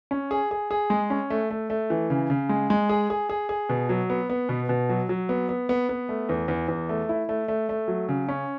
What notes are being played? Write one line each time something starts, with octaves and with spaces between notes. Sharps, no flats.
C#4
G#4
G#4
G#4
G#3
C#4
A3
A3
A3
E3
C#3
C#3
G#3
G#3
G#4
G#4
G#4
G#4
B2
F#3
B3
B3
B2
B2
F#3
F#3
B3
B3
B3
B3
A3
E2
E2
E2
A3
E4
A3
A3
A3
F#3
C#3
C#4